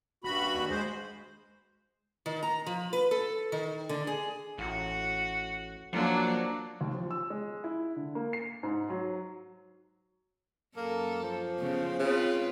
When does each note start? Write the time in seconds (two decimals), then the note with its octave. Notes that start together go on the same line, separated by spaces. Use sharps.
0.24 D#1 G2 F#4 B5
0.54 D#2
0.70 G#3 C5
2.26 D#3
2.43 A#5
2.66 F3
2.93 B4
3.11 A4
3.52 D#3
3.89 D3
4.07 G#4
4.58 A1 F#4
5.93 F3 F#3 A#3 D4
6.81 D#2
6.94 F3
7.11 E6
7.30 G#3
7.64 E4
7.96 D3
8.15 A#3
8.33 C7
8.63 G#2
8.90 F#3
10.77 F#2 A#3 A4
11.23 F3
11.59 C#3 B3
11.99 C#3 C4 F4 B4